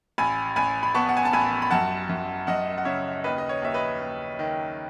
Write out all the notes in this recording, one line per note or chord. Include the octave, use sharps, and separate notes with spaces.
A1 G#5 B5
A1 G#5 B5
B5
B3 A5 C#6
F#5
G#5
A5
A1 G#5 B5
B5
F#2 F#5 A5
F#2
F#2 D#5 F#5
F#5
C#3 C#5 E5
D#2 B4 D#5
D#5
C#5
D#2 E5
B4 D#5
D#2
D#3